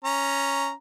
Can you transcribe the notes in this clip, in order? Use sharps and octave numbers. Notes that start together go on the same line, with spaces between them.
C#4 A#5